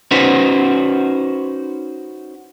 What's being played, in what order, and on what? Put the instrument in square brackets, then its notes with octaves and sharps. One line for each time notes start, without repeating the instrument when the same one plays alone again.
[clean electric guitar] C#4 D#4 F#4 B4 C5